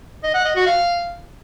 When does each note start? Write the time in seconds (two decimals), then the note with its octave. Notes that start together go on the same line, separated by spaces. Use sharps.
0.23 D#5
0.34 F#5
0.45 D#5
0.56 F#4
0.66 F5